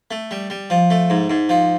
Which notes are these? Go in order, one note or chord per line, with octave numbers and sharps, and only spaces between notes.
A3
G3
G3
F3
A3
G#2
G#2
F3